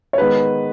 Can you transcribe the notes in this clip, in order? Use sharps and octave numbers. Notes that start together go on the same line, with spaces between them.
C#5
D#3 G#3 B3 B4